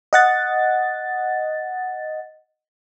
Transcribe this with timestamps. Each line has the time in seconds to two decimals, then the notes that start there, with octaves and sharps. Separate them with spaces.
0.13 D#5 F#5 A6